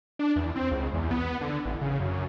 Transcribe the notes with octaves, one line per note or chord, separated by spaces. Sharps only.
D4
E2
C4
C#2
E2
B3
D3
A1
C#3
F#2